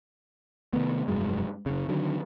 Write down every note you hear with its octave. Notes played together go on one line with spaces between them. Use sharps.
C3 D#3 A3 B3
F1 G2 F#3 G#3
F#1 C#3
D3 D#3 F#3